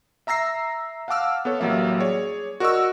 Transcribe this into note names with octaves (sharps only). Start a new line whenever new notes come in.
E5 A#5 E6 A#6 C7
F5 F#5 A5 D6 E6 F6
B3 A4 C#5
A1 F#3 G3 A#3 E5
G#4 C#5 D5
F#4 A#4 D5 D#5 C#6 E6